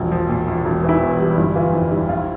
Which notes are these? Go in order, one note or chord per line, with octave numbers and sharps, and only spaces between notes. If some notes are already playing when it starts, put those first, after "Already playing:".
Already playing: E1 A#1
F3
A#2
A#1
E1
E3
E4
E2
G3
G1 E4
E3 F4
F2 E4
G3 E4
A#1 F4
E4